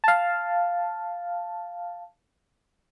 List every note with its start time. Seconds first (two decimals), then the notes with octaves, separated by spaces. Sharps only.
0.04 F5 A5